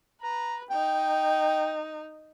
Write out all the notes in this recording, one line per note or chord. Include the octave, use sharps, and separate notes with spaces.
B4 A#5
D#4 G5